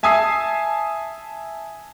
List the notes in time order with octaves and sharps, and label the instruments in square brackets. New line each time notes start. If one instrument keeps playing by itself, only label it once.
[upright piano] E5 G#5 A5 D#6 E6 C7